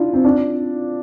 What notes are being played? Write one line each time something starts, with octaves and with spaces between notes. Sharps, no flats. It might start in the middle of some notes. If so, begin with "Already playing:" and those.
Already playing: D4 E4 F4
C4
D4